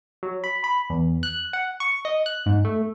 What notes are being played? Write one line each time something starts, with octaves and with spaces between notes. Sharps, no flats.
F#3
B5
B5
E2
F#6
F#5
C#6
D#5
F#6
G#2
A3